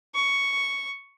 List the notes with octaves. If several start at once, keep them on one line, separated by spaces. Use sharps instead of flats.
C#6